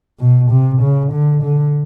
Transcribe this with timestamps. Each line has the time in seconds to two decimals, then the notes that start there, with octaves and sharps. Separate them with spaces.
0.20 B2
0.51 C3
0.82 C#3
1.13 D3
1.43 D3